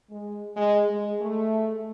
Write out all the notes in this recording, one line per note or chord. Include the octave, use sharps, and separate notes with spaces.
G#3
G#3
G#3
A3